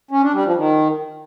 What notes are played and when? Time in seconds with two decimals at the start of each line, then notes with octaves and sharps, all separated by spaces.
0.11 C#4
0.22 D4
0.34 G3
0.45 F3
0.56 D#3